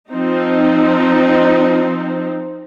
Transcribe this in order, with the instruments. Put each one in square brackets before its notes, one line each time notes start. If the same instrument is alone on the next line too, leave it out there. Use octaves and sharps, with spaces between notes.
[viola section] F3 C4 D#4